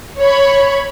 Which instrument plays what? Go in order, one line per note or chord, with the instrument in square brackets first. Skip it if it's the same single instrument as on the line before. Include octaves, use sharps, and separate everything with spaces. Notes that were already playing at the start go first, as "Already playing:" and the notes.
[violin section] C#5 B5